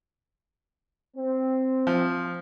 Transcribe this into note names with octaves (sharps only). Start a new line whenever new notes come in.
C4
F3